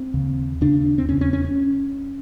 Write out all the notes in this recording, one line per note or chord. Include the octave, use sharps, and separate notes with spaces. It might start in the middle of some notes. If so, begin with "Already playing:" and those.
Already playing: C4
D#2 C#3
D#2 C#3 D4
C4
E2 C#3 C#4
C#4
C#4
C#4